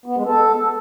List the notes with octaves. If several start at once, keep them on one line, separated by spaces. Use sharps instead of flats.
B3
G#3
A4